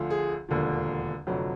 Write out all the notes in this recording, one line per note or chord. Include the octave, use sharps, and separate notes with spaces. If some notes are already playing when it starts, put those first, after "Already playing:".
Already playing: D2 D3 F3
G#4
E1 D#2 D3 F3
F1 F2 D3 F#3